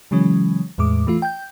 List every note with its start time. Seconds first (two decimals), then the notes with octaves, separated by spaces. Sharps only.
0.11 C#3 E3 F#3 G#3 C#4
0.78 E2 A2 G#3 D6
1.07 E3 A3 F4
1.22 G5 G6